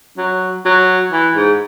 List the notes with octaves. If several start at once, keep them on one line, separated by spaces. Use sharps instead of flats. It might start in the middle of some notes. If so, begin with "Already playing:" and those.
F#3
F#3
E3
G#2